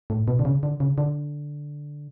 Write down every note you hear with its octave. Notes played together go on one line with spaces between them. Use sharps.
A2
B2
D3
C#3
D3
C#3
D3